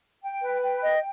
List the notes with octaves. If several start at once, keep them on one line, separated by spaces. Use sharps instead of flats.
G5
B4
G5
D#5